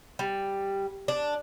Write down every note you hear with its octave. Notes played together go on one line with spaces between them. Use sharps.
G3
D4